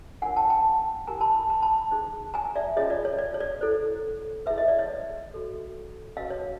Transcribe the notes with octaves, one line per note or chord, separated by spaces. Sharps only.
D4 F4 A#4 C#5 F#5 G#5
G5 A5
G5 A5
E4 G4 A#4 G#5 A#5
A5 B5
B5
A#5
A5 B5
D#4 G#4 C5
G#5 A#5
D5 E5
C#4 F4 G#4 C#5 D#5
D5
C#5
D5
C#5
D5
E4 A4 C5
E4 G#4 B4 E5
D#5
D5
C#5 D#5
F#4 A4 C#5
C#4 F#4 B4 D#5 F5
C#5